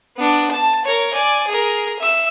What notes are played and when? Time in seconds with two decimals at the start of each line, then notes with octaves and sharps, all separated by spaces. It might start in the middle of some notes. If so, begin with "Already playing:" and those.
0.17 B3 D4
0.51 A5
0.85 A#4 C#5
1.14 D5 G#5
1.47 G#4 A#4
1.99 E5 E6